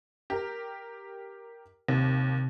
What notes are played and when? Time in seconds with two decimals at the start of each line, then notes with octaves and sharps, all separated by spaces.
0.30 G4 A#4
1.88 D#2 C3